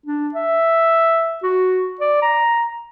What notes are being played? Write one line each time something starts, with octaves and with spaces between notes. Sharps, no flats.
D4
E5
F#4
D5
A#5